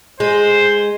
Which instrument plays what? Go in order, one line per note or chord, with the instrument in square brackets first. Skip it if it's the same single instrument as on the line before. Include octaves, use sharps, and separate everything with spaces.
[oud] G#3 [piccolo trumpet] C5